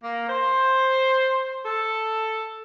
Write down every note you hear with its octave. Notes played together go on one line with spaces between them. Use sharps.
A#3
C5
A4